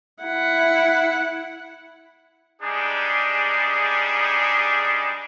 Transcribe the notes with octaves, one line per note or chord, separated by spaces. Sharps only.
E4 F#5
G3 G#3 D4 D#4 G#4